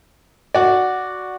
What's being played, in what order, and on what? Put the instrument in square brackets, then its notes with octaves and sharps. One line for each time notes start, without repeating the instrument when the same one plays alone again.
[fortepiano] F#4 D5